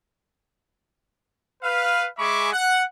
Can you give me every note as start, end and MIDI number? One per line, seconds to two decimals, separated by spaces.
1.63 2.07 71
1.63 2.07 77
2.18 2.51 56
2.18 2.51 68
2.18 2.51 76
2.18 2.51 83
2.18 2.51 85
2.18 2.51 86
2.53 2.83 78